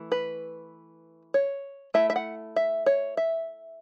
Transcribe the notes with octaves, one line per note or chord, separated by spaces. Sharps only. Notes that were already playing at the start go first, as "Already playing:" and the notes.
Already playing: E3 A3
B4
C#5
A3 E4 E5
E5
F#5
E5
C#5
E5